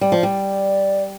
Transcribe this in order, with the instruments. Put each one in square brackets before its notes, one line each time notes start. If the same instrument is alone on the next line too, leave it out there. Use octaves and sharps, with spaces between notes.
[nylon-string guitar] G3 [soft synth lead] D5
[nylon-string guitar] F3
G3